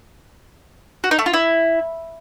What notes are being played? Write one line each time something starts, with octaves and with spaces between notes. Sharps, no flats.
F#4
D#4
A3
F4
E4